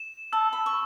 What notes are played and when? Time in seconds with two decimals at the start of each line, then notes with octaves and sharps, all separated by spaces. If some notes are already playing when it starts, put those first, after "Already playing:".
Already playing: E7
0.33 A5 E6
0.53 B5
0.66 C#6